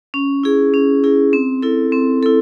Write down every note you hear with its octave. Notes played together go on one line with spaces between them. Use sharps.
C#4
E4 G#4
C#4
E4 G#4
C4
E4 A4
C4
E4 A4